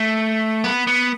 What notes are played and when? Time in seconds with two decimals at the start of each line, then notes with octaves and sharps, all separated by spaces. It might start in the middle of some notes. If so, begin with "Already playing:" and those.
Already playing: A3
0.64 B3
0.87 B3